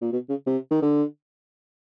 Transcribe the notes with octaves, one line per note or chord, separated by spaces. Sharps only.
A#2
B2
C#3
C3
D#3
D3